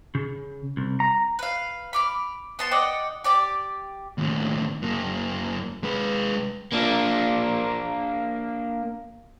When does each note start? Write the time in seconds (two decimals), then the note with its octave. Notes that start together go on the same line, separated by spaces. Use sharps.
0.15 C#3
0.77 C2
1.00 A#5
1.39 B4 F5
1.93 B5 D6 F6
2.59 B3 A5 C6
2.71 D5 D#5 F#5 G5
3.24 G4 D5 D6
4.18 D#2 A2
4.82 F#2 A#3
5.83 G#3 B4
6.72 A#3 D4